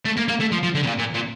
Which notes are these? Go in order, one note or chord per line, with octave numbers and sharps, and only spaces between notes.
A3
A#3
A#3
A3
F3
F3
D3
C3
A#2
A#2
A#2